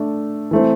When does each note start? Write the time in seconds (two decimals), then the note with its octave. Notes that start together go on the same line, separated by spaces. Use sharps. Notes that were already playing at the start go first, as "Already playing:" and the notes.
Already playing: A3 D4
0.51 E3 A3 C4